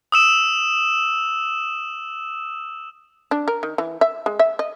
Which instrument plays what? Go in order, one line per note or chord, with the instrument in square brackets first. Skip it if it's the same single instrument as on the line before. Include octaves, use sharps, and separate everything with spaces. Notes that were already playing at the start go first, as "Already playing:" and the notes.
[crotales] D#6 E6 E7
[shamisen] D4
A#4
D#3
E3
E5
G#3
E5
D#5